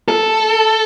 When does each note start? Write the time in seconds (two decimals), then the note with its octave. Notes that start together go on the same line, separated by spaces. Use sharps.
0.08 A4